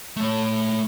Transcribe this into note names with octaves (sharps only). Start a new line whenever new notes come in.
A3 C#5